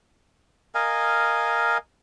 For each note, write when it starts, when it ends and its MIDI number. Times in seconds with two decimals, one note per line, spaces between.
0.75 1.78 70
0.75 1.78 75
0.75 1.78 77
0.75 1.78 80